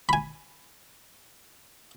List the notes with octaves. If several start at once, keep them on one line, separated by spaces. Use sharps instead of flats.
G#5 B5